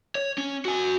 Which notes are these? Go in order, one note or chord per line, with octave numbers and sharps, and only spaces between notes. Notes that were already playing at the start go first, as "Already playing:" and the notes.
C#5
C#4
F#4 G#5